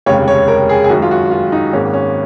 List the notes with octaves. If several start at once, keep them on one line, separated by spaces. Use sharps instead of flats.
F1 D#2 C#3 G#3 C#5
C#5
A#4
G#4
G#4
F#2 D#3 G#3 F#4
F4
F#4
F4
D#4
G#1 G#2 D#3 A#3 C#4
C#4